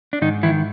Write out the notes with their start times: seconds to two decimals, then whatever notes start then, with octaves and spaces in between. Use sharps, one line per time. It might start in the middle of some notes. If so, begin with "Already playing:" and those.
0.13 D4
0.22 G#2 D#3 D#4
0.43 D#3 E3 E4